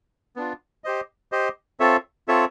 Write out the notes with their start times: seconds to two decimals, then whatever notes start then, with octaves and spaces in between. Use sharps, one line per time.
0.36 B3 D4 F4
0.84 G4 C5 D#5
1.32 G4 C5 D#5
1.80 C4 F4 A4 C#5 E5
2.28 C4 F4 A4 C#5 E5